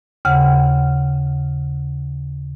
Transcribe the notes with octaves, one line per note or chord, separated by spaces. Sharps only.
D#2 C#3 F#5